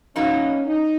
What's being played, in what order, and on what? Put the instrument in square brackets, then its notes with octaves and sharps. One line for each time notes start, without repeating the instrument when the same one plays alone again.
[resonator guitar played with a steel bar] B2 F#3 A#3 D#4 [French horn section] C#4
[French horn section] D#4